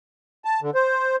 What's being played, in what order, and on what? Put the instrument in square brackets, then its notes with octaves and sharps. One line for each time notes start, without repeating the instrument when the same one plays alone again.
[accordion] A5
D3
C5